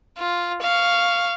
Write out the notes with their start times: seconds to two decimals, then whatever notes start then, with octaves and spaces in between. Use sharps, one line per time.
0.18 F4
0.62 F5 C#6